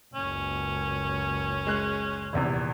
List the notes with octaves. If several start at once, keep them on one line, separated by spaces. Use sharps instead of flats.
F#1 C#2 C#4
G#3 F#6
D#1 E2 C3